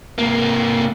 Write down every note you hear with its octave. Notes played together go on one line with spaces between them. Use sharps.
C3 A#3